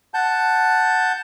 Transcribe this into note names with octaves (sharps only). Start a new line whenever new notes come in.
F#5 A5 G6